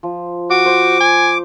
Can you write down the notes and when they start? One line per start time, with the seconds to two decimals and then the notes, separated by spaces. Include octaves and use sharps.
0.03 F3
0.50 F#4 D6
0.66 C5
1.00 G#5